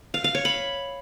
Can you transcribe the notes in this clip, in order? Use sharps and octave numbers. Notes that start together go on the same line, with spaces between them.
F5
F5
C#5
B5